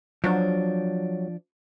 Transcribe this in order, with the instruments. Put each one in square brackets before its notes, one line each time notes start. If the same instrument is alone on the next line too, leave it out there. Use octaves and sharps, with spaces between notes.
[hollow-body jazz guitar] F3 D4 [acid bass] F#3